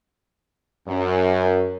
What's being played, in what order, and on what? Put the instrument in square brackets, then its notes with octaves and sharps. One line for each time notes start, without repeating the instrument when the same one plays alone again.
[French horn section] F#2